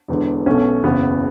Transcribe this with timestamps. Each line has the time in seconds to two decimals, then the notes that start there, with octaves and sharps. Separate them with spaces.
0.08 E1 E2 D3
0.46 B1 B2 A3 C#4
0.83 F#1 E2 C#3 B3